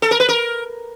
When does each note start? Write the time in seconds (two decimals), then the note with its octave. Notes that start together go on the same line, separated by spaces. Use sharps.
0.02 A4
0.11 A#4
0.20 B4
0.29 A#4